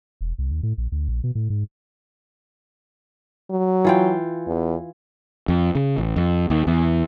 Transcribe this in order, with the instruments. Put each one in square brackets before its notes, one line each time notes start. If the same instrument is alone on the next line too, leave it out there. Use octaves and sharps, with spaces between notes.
[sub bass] E1
C2
D#2
A2
A#1
D2
A#1
B2
A2
G#2
[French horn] F#3
[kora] E3 F4 G5
[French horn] E2
[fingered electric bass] F2
C#3
A1
F2
D#2
E2